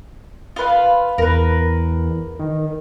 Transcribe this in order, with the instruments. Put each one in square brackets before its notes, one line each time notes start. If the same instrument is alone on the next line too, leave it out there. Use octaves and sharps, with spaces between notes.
[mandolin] F4 B4 F5
[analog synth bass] E2 [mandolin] A#4 B4
[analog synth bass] D#3